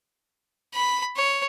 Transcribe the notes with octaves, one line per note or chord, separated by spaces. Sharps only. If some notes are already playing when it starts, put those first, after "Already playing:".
B5
C#5